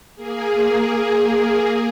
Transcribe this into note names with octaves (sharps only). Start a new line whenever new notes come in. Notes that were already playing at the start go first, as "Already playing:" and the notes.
A#3 G#4